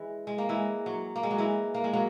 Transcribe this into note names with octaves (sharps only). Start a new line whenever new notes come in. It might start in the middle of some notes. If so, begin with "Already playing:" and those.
Already playing: E3 G#3
G#3
A#3
E3 G#3
F#3
A#3
G#3
F#3
E3 G#3
A#3
G#3
F#3 A#3